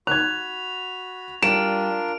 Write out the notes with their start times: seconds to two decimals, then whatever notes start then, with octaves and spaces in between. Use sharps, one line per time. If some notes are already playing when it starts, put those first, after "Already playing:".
0.07 F#4 B5 F#6 G#6 F7
1.43 G3 D4 F4 A#4 D7 E7